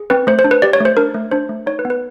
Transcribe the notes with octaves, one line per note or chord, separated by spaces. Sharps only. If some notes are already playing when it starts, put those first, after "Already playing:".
Already playing: G#4
C4 B4
A3 C5
C5
D4
B4
G4 D5
C#5
A3 C5
D4 A#4
A3
D4 C5
A3
D#4 C#5
B4
B3
B4